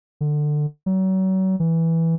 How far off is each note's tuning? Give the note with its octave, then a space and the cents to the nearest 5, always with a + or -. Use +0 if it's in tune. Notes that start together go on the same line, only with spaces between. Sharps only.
D3 +20
F#3 +35
E3 -5